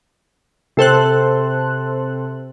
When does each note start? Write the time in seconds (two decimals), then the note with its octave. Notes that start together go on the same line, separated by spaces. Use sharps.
0.77 C3 A4 C5 F#6